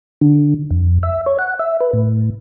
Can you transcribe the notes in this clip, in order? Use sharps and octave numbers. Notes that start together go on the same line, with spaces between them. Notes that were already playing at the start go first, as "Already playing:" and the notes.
D3
F2
E5
C#5
F#5
E5
B4
A2